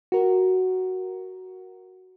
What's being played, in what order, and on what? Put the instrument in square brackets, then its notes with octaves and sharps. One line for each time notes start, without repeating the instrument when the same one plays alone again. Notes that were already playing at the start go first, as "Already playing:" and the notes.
[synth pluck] F#4 A#4